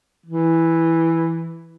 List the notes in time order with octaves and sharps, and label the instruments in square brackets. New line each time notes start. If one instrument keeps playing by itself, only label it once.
[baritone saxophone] E3